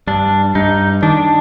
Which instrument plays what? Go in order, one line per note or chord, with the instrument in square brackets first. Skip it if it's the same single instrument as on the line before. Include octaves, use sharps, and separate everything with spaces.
[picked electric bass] G2 [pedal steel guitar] D4
[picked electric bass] G2 [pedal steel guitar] D#4
[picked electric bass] D#3 [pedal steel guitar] D4